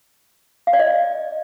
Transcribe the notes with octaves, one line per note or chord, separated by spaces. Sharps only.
F5
D5
D#5